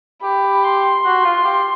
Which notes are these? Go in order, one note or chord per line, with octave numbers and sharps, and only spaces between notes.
G4 B5
C6
F#4
F4
G4